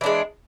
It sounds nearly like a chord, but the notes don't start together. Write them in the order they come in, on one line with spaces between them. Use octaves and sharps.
E3 D4 G#3